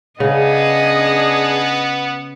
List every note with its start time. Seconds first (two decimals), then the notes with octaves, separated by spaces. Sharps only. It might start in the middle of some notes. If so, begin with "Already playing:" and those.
0.20 C#3 B3 D4 G#4 D#5